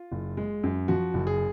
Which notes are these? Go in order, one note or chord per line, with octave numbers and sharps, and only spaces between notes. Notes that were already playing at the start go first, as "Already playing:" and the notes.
Already playing: F4
F#1
G#3
F#2
F3 F#4
F#1
G#4